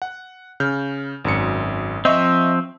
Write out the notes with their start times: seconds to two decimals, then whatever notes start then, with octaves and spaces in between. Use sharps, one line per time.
0.02 F#5
0.60 C#3 F6 G6
1.25 G#1 F#2 C#7
2.05 F3 C4 D#5 E5 C#6